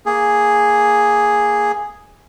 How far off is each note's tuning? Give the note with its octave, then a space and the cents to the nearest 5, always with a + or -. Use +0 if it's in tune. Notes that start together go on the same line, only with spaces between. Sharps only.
A#3 +0 G#4 +0